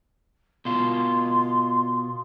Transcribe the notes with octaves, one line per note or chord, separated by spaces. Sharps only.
B2 F4 C6